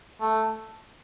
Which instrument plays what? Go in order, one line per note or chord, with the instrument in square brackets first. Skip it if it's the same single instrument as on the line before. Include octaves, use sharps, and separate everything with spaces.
[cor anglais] A3